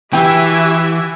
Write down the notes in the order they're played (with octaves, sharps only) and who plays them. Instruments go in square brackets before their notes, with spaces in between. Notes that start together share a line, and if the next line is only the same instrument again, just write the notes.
[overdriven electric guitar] E3 [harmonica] E4 F#4 G#5 [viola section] G4 E5 [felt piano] G5